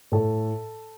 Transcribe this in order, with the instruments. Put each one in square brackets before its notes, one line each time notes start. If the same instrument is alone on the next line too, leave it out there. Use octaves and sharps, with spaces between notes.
[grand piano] A2 A4